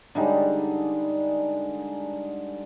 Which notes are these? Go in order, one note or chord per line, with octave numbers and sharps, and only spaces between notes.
D3 G3 G#3 D#4